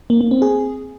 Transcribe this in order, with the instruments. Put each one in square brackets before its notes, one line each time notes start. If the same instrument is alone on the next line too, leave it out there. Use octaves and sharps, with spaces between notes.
[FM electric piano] A#3
A#3
C4
G#4